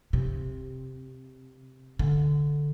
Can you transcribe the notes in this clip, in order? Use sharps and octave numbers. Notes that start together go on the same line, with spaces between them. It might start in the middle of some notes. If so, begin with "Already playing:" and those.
C3
D3